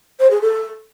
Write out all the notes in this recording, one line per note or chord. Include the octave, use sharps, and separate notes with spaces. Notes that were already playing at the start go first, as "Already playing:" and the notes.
C5
G#4
A4